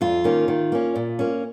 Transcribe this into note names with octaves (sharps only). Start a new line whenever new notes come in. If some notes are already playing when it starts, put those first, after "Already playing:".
F2 F4
D#3 A#3 C#4
D#3
A#3 C#4
A#2
A#3 C#4